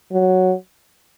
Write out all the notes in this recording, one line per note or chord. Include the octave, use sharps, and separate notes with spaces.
F#3